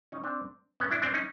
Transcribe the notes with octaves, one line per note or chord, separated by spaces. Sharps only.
C#4 D#4
C4 D4
B3 C#4
D4 E4
C4 D4
C#4 D#4